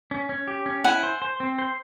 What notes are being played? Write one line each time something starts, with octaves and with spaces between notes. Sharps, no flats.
C#4
C#4
G4
C#4
E4 F#5 G#5
C5
C5
C4
C5